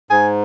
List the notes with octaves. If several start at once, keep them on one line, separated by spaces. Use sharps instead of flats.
G#2 G#5